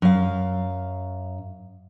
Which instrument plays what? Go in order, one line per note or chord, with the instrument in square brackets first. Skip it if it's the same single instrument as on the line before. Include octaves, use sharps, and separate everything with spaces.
[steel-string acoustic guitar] F#2 F5